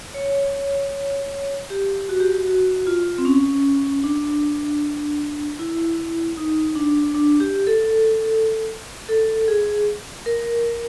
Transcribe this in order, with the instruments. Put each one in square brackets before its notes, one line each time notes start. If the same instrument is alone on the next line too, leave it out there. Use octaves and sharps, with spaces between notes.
[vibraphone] C#5
G4
F#4
G4
F#4
F#4
F4
C4
C#4
D4
E4
D#4
D4
D4
G4
A4
A4
G#4
A#4